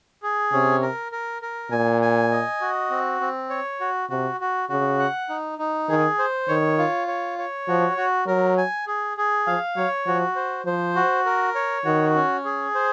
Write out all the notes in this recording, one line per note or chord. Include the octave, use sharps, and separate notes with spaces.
G#4
C3 C#4
A#4
A#4
A#4
A#2 G#5
G#5
D#5
F#4
C4
C4
C#5
F#4
C3 F#4
F#4
C#3 F#4
F#5
D#4
D#4
D#3 G#4
C5
D#3 C#5
F4
C#5
C#5
F3 F#4
F#4
F#3 A#4
G#5
G#4
G#4
F3 F5
F#3 C#5
F3 F#4
C5
F3 C5
F#4
A#4
C#5
D#3 F#4
C#4
G#4
C5